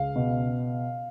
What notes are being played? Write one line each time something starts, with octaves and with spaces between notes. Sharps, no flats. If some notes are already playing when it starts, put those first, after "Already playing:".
Already playing: C#2 F5
B2